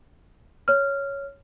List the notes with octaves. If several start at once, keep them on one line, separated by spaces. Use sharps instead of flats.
C#5 F6